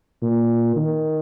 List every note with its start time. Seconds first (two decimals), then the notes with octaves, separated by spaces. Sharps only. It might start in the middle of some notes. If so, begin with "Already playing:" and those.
0.22 A#2
0.76 D#3